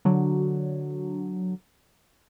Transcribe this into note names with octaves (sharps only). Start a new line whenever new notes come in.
D3 F#3